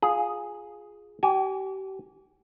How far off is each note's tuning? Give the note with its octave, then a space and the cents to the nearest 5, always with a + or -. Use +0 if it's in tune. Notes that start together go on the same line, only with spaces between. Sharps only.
F4 +15 G#4 +0
G4 -35 G#5 -5